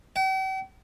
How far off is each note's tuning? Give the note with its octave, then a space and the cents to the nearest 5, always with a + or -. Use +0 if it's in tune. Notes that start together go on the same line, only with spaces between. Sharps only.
G5 -45